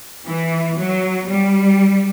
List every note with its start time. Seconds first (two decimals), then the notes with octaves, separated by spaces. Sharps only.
0.27 E3
0.77 F#3
1.28 G3